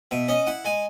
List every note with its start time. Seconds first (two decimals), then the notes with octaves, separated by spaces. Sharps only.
0.11 B2 E5
0.28 C#4 D#5
0.47 E4 F#5
0.65 G#3 G#5